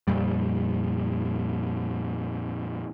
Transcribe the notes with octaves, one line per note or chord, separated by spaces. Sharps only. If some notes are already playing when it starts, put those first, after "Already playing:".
F2 A#2 G3